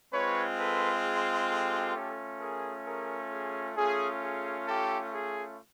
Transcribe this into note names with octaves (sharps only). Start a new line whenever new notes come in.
G#3 C4 F4 B4 C#5
A4 B4
G#4
G4 A4
A3 C#4 F4
G#4 A#4
G#4 A#4
G#4
A3 C#4 F4 G#4
G#4
G4 A4
G#4